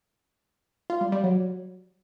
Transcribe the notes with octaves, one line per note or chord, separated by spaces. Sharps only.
F4
G3
G3
F#3